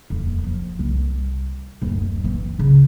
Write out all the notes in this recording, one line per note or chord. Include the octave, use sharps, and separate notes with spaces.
D#1 F2
F3
C2
D1 F#2
E3 C4
D2 C#3